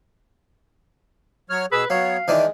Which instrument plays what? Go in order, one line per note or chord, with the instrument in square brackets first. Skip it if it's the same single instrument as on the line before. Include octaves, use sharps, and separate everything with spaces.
[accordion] F#3 C#5 F6
[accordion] B2 G#4 E6 [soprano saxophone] B4
[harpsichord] F#3 [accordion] B3 C#5 [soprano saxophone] F5
[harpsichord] D#3 E3 D4 [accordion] G#3